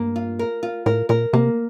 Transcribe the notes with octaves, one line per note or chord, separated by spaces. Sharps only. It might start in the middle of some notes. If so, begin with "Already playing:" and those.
Already playing: G2 A#3
F4
A#4
F4
A2 A#4
A#2 A#4
C3 A#3